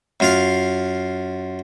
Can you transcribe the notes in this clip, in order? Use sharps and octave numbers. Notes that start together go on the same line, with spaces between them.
F#2 F4 F5